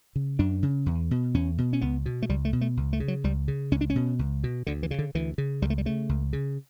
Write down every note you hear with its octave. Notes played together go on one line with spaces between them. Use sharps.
C#3
F#2 D4
C#3
E2
B2
E2 C#4
B2
C#4
C#2 B3
B2
A3
C#2 G3
A3
B2
A3
C#2
A3
C#3
F#3
C#2 G3
C#3
C#2 C#4
D4
C#4
B2
C#2
B2
D2 D3
E3
C#3
D3
D2 E3
C#3
C#2 G3
A3
G3
C#3 A3
C#2
C#3